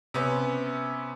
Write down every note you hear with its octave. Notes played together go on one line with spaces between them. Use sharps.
C3 B3 C#4